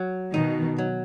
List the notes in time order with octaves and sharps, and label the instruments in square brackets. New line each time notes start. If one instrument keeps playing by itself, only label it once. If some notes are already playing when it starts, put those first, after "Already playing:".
Already playing: [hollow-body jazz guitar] F#3
[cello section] B2 D#3 [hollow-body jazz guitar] D#4
[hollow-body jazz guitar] F#3